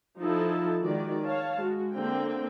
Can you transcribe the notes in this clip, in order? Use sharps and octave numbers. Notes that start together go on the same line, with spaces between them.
F3 D#4 E4 A4 A5
D#3 G#3 F#4 D5
C#5 F5 A5
G#3 F#4
D3 A#3 C4 G5